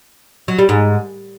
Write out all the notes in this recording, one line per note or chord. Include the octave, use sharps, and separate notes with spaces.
F#3
G3
G#2